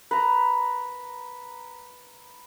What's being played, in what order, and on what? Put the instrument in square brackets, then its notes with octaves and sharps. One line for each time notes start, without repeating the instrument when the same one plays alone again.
[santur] B4 A#5